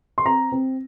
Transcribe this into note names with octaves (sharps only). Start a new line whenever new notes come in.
C6
C4 A#5
C4